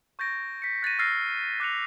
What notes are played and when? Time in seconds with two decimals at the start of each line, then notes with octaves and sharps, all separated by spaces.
0.19 C#6 G6 A6 A#6 D7
0.62 B6 C#7
0.83 F#6 A6 A#6 D#7
0.99 E6 F6 A6 A#6 C7 C#7
1.60 D6 F#6 A6 C#7 F7